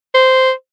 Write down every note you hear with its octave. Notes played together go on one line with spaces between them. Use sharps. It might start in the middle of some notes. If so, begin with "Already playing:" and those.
C5